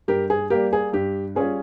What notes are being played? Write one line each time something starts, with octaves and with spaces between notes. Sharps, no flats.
G2 G4 A#4
G#4
G3 A#3 G4 A#4
G#4
G2 G4
G3 C#4 F4 G#4